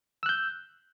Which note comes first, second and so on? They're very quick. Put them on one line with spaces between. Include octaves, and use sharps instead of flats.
E6 F#6 G6